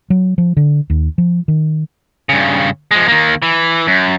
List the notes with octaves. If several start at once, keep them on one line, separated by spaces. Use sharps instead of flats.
F#3
F3
D3
D#2
F3
D#3
G2 C#3
F3 G#3
D#3 A#3
E3
F#2